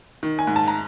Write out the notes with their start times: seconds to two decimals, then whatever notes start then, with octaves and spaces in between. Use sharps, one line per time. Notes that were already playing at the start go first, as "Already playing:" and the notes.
0.23 D#3
0.39 G#5
0.47 G#2
0.56 A5
0.68 A#5